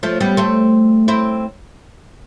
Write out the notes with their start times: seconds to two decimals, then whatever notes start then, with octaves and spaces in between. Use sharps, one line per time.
0.03 F3 A3
0.20 G3 B3
0.37 A3 C4
1.08 C4 E4